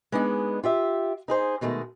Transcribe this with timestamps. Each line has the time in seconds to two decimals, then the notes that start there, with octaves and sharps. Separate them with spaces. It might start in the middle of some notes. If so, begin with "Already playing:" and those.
0.12 G#3 B3 D4 D#4 G4 G#4
0.63 F4 G4 E5
1.28 D#4 G#4 C5
1.61 B2 D#3 G#3 A3